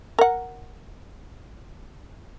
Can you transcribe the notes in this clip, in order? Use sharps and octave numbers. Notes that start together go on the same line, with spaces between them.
A#4 F#5